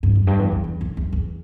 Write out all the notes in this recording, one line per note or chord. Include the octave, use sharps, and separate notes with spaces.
G2
F2
G2
E2
F2
E2
F2
E2
E2